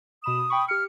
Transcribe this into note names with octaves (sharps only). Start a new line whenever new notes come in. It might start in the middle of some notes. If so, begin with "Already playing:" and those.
B2 B5 D#6 E7
G5 B5 C#6
G4 F6 C#7